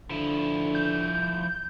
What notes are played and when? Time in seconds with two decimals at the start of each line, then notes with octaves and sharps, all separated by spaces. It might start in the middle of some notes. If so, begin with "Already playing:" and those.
0.10 D3 F3 E4
0.75 G6